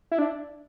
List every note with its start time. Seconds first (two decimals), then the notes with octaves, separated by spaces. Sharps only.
0.12 E4
0.19 D4